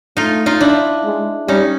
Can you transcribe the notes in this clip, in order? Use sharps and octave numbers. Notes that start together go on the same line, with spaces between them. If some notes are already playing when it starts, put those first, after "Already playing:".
A3 D#4 F4
D#4 F4
D4 E4
G#3
G3 C#4 D#4